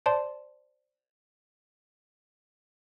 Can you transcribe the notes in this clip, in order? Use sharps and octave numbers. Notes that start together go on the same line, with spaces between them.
C5 D5 A5 C6